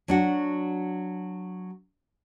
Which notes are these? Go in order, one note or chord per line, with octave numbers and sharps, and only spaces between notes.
F#3 D4 F#4